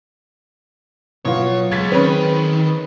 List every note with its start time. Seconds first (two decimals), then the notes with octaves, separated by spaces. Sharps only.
1.25 B2 F#3 A#3 F4 C#5
1.71 C#2 G#4 G#6 A6 B6
1.92 D#3 C4 C#4 B4